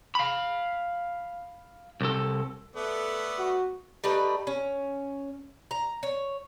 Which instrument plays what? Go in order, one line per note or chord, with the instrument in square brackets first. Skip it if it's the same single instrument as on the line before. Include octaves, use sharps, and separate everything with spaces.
[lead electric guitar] F5 B5
C2 A4
[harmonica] A3 B3 D5 [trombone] A4
[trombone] F#4
[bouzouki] G3 A3 D#4 B4
C#4
A#5
C#5